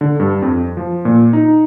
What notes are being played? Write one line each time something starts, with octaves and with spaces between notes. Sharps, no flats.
D3
G2
F2
F3
A#2
D#4